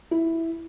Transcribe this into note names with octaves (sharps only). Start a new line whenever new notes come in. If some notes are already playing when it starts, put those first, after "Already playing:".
E4